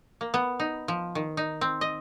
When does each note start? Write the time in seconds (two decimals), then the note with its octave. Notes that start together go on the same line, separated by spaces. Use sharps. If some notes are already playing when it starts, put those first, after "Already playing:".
0.21 A#3
0.34 B3
0.60 D#4
0.88 F3
1.15 D#3
1.37 D#4
1.61 C4
1.81 D#5